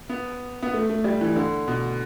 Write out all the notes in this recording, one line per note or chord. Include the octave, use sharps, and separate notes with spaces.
B3
B3
A3
A3
G3
E3
D3
B2